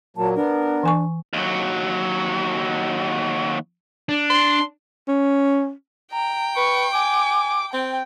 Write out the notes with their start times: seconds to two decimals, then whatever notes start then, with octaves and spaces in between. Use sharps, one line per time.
0.17 A#2 F#3 A#3 A5
0.36 B3 D4 A#4
0.83 E3 G#5 C#6
1.33 D#2 F#3
4.09 D4
4.30 C6
5.08 C#4
6.12 G5 A#5
6.57 B4 C#6
6.95 G#5 D6
7.73 C4 G5